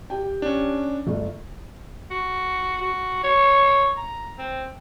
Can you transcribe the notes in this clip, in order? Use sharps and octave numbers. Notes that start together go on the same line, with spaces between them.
G4 G5
C#4 D4
G1 A3
F#4
F#4
C#5
A#5
C4